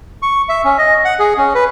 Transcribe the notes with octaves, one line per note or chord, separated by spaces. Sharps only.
C#6
E5
C#4
D#5
F#5
G#4
C#4
B4